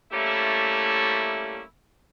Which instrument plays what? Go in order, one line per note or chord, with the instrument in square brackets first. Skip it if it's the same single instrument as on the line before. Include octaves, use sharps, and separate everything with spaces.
[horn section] G3 A3 A#3 C#4 E4